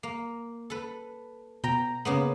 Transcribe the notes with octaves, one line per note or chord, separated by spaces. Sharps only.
A#3
A4 B4
B2 G5 A#5
C#3 A#3 B3